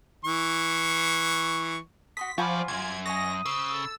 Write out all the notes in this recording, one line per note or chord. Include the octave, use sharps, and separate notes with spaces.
E3 C#6
F#4 C6 D#6 B6
F3 F#3 F4 D5 F#5 G#5 B5
C#2 F#2 G#6
C#5 D#5 G#5 D#6 A#6
C#3 C5 E6
A4